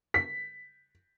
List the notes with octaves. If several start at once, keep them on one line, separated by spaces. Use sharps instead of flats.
B6